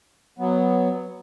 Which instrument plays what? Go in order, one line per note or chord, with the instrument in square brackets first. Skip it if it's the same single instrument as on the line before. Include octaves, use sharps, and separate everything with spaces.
[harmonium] F#3 B3